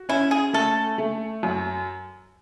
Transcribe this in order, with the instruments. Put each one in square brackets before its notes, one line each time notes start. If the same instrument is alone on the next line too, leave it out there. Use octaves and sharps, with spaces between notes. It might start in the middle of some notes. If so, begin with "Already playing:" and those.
Already playing: [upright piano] F#4
[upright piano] C#4 [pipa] E4
[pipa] G#4
[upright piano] A3 [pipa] A4
[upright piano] A3
F#2